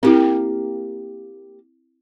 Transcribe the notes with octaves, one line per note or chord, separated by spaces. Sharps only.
A#3 C4 E4 G4